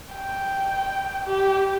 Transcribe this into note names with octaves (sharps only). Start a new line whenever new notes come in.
G5
G4